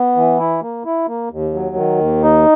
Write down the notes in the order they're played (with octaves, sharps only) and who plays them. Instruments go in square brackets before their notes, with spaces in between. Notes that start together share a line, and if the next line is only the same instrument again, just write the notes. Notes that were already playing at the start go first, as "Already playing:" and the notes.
Already playing: [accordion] B3
E3
E4
A#3
E4
A#3
D#2
F#3
D#3
D#2
D#4